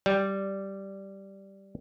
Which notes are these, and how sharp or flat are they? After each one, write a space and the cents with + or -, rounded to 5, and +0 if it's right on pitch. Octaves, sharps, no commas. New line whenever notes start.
G3 -5 D5 -10